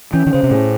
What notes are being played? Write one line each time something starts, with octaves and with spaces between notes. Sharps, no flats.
E3 C#4
D#3
C#3 C5
C3
A2 G#4